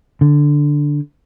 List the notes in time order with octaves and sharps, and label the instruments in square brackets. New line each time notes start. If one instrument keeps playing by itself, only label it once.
[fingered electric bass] D3